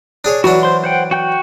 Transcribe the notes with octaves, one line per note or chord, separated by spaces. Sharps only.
D4 G#4 C#5
E3 F#3 D4 F#4
C5 C6
C5 F#5 G5
F#4 G5 G6